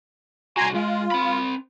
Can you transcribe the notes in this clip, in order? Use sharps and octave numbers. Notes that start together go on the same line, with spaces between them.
C2 F#4 G#5 A#5 C6
G#3 F4
C4 B5